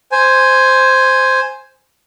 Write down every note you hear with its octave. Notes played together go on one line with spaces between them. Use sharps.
C5 G#5